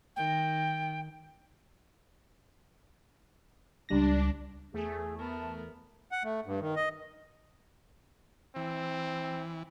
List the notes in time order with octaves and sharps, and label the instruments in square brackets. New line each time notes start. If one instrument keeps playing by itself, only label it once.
[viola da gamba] D#3 [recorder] G5
[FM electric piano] C#2 G3 A#6 [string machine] D4
[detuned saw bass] E2 [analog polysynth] A3 [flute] G#4
[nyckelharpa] B3 A#4 [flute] A5
[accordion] F#5
A3
G2
D#3
D#5
[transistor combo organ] E3 [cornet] C4